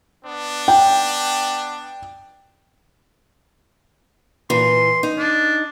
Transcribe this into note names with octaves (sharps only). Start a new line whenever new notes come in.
B3 D4
G5
A#2 E3 C6
D#4
D4